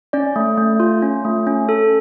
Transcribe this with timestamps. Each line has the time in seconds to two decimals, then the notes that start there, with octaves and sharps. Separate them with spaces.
0.13 C#4 D5
0.36 A3
0.58 A3
0.80 F4
1.02 C#4
1.25 A3
1.47 C#4
1.69 A4